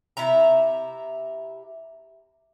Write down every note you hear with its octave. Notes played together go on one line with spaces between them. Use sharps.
C3 E4 E5 A#5